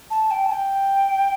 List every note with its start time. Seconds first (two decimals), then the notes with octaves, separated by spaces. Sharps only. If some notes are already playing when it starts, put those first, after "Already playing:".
0.11 A5
0.31 G5
0.45 A5
0.51 G5